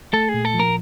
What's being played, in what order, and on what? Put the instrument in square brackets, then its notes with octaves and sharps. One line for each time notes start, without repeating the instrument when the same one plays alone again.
[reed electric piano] A3 [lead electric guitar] A4
[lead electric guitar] G#4
[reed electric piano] A#2
[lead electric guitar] A4
[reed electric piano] F3
[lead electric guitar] A#4